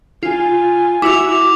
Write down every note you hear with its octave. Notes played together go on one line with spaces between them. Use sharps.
F4 G#5
E4 F#4 D6 E6 F7